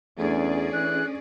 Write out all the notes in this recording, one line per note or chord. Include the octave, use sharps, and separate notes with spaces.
E2 A3 C#4 D4 G#4 D5
E3 F#6